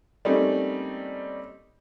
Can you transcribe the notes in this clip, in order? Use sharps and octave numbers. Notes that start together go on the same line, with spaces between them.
G3 A3 A#3 C4 C#4 D#4